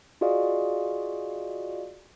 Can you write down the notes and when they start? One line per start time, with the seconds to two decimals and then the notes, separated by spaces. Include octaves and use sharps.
0.21 F4 F#4 G#4 D5 D#5 F5